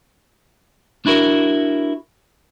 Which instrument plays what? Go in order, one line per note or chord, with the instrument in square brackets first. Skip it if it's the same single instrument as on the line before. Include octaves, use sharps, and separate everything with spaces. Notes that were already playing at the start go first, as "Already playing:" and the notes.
[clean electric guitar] D4 E4 F#4 A#4